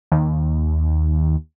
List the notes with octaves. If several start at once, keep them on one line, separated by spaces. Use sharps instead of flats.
D#2